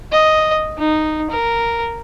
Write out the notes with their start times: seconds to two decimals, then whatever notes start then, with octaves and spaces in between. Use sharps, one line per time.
0.12 D#5
0.78 D#4
1.30 A#4